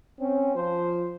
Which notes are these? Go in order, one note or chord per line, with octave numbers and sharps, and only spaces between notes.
C4 C#4
F3 C5